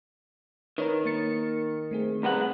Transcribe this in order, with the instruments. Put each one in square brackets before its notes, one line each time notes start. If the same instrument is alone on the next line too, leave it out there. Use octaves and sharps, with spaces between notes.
[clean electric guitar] D#3 [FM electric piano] B4 C#5 A#5
[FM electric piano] A#3 A6 C#7
A3 C4 G#4
[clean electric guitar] C2 B3 F#5 [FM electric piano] G#4 A#5